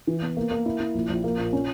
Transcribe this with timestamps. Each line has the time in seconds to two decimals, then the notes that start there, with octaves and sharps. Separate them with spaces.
0.07 E3
0.22 B3
0.37 A#3
0.51 A#3
0.66 E4
0.80 E4
0.95 A#1
1.10 A#1
1.24 A#3
1.38 A#2
1.53 C#4